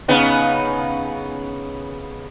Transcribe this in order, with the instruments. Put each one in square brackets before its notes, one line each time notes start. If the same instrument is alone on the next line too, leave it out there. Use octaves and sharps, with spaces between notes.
[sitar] C#3 B3 D#4